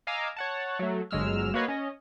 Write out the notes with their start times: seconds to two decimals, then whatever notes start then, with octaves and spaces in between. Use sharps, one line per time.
0.07 D#5 F5 G#5 A#5 D6 E6
0.36 C#5 F#5 A5
0.79 F#3 A3
1.11 G1 F#3 G#3 E6 F6
1.54 A#3 F#4 B4 C#5 D#5 F5
1.68 C#4 D#5